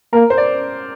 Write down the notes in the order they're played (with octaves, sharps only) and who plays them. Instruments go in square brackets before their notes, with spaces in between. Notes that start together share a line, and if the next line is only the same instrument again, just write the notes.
[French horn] A#3 [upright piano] A#4
[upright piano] C5
D5